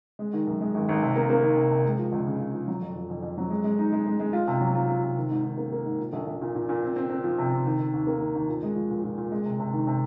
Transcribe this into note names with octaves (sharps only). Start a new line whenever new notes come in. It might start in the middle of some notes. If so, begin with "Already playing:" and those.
G#3
D#3
F#2
G#3
G#1
G#1
C3
A#3
A#3
D#3
C3
C3
G#3
F3
C#2
C#3
F3
F3
F#3
F2
F2
F2
F2
F#3
G#3
G#3
D#4
G#3
G#3
G#3
F4
C3
F#3
F4
F4
C3
D#3
G#2
D#3
A#3
A#3
G#2
A#2
A#1
A#1
A#2
A#2
A#2
C4
C4
C4
F3
C3
C4
D#3
D#3
D#2
A#3
D#3
D#2
A#2
G#3
F3
A#2
A#2
A#2
G#3
C3
C3
D#3
C3